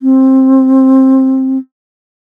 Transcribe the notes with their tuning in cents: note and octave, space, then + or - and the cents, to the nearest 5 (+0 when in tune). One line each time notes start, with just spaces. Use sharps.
C4 +15